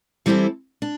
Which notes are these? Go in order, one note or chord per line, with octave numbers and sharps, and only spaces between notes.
E3 G3 C4 E4 A4
D4